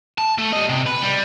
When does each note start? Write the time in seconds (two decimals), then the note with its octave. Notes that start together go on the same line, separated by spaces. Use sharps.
0.18 A5
0.38 A3
0.53 G3 D#5
0.69 C3
0.86 B4
1.02 G3